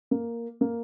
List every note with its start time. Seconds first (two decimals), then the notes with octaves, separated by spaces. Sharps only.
0.11 A#3
0.61 A#3